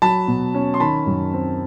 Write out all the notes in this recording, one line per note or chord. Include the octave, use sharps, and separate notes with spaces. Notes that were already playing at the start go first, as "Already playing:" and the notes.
F#3 A5 B5
B2
C#4
C6
D#3 A5 B5
F#2
C4